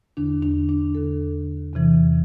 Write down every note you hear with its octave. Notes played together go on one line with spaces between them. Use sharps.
E2 D3 D4
D4
D4
E2 D3 A4
E2 C3 E3